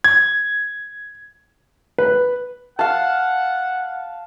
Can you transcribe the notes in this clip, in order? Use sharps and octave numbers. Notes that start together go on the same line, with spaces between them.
G#6
B4
F5 F#5 A5